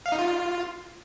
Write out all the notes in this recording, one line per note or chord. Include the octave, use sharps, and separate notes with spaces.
F5
D#4
F4